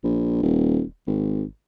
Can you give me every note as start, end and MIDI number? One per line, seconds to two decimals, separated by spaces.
0.04 0.40 34
0.43 0.82 27
1.07 1.44 32